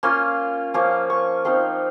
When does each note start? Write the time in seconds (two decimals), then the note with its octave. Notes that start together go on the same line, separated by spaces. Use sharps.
0.03 A#3 C#4 F4 C6
0.74 F3 A#3 C#4 F4
1.10 C#6
1.45 F3 C4 D#4 C6